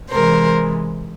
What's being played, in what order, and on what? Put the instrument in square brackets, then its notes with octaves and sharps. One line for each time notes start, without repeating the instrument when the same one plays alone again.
[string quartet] C3 E3 G#3 A#4 C5